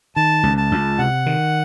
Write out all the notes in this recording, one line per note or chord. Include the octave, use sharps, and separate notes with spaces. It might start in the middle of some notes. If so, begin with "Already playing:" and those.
D#3 A5
C#2
A5
C#2
C3 F#5
D#3